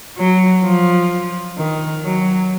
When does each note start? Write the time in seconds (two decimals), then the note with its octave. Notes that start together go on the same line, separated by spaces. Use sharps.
0.18 F#3
0.63 F3
1.58 D#3
2.04 F#3